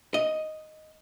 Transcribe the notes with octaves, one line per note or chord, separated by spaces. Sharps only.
D#5